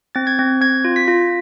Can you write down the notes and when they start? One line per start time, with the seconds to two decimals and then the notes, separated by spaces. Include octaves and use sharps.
0.15 C4 A6
0.27 G#6
0.39 C4
0.61 C4 G#6
0.85 F4
0.96 B6
1.08 F4